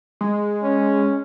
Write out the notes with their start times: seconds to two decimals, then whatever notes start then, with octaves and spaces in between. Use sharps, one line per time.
0.21 G#3
0.63 C#4